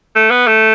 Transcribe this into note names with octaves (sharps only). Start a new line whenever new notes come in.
A3
B3
A3